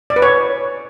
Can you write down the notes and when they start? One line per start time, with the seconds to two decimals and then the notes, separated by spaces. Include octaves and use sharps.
0.10 D5
0.16 B4
0.22 C#5